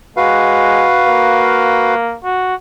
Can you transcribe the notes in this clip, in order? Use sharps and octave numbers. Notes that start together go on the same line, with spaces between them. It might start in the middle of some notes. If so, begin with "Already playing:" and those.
G#3 F#4 B4 F5
A#3
F#4